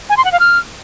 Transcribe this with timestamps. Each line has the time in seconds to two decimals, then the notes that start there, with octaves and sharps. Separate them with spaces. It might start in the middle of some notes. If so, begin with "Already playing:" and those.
0.09 G#5
0.17 C6
0.24 F#5
0.32 F5
0.40 F6